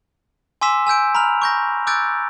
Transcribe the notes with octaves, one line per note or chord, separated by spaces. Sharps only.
G#5 C6 D6 E6 B6 E7
G#5 E6 G6 D7
A#5 B5 F6 F7
C#6 G6 A#6
D6 E6 F#6 G6 A6 D7